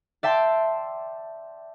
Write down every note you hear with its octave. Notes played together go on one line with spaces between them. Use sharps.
D5 E5 G5 A5 C6